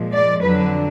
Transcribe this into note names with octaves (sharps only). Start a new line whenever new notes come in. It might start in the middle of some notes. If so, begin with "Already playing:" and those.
Already playing: A#2 F3 G#3
D5
F2 D3 F#3 D4 B4